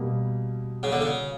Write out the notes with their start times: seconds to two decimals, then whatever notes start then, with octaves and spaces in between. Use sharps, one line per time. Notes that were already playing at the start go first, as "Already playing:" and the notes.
Already playing: B2 G3 A#3
0.83 C#3
0.92 D3
1.01 C#3